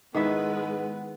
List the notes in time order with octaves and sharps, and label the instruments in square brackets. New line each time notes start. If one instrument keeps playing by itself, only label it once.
[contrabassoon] G#2 [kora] D#3 E4 E5 [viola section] G#3 B4 [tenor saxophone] B3